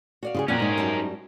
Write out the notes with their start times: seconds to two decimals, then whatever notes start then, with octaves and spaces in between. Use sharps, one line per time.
0.23 F#4 D5 F5
0.35 C#3 F4 G#4
0.48 F2 A#2 C#4 A#4 D5 F#5
0.60 G#2 D#4
0.77 F#2 G3 A5